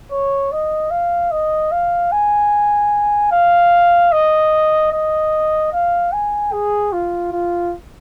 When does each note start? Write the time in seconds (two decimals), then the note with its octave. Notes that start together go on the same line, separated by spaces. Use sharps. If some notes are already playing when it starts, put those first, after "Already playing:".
0.11 C#5
0.52 D#5
0.91 F5
1.31 D#5
1.71 F5
2.12 G#5
3.31 F5
4.12 D#5
4.92 D#5
5.73 F5
6.12 G#5
6.52 G#4
6.92 F4
7.32 F4